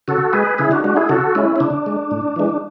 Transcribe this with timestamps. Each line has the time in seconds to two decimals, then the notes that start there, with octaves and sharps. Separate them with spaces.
0.08 C#3 F#4 A4
0.33 G#3 G#4 B4
0.58 C#3 E4 G#4
0.71 D4 F#4
0.84 G#3 D4 F#4
0.96 E4 G#4
1.09 C#3 F#4 A4
1.35 G#3 C#4 E4
1.56 C#4
1.60 C#3 D4
1.86 G#3
2.11 A2
2.36 E3 G#3